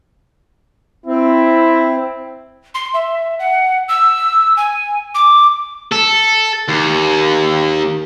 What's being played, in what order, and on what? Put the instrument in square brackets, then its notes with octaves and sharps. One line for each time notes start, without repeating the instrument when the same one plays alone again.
[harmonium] C4 [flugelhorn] E4
[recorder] C6
E5
F#5
E6
G#5
D6
[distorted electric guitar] A4
D#2